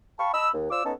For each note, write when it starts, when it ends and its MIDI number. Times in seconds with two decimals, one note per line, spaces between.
0.19 0.31 77
0.19 0.31 79
0.19 0.31 81
0.19 0.31 83
0.19 0.31 85
0.34 0.48 75
0.34 0.48 81
0.34 0.48 83
0.34 0.48 88
0.54 0.68 39
0.71 0.82 65
0.71 0.82 72
0.71 0.82 74
0.71 0.82 86
0.71 0.82 88
0.85 0.93 59
0.85 0.93 61
0.85 0.93 63
0.85 0.93 69